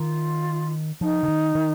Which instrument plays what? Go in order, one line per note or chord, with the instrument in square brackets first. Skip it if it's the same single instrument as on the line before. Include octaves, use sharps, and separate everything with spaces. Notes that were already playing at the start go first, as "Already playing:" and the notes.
Already playing: [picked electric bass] D#3 [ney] F4
[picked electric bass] F3 [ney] D#4
[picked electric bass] D3
D#3
D#3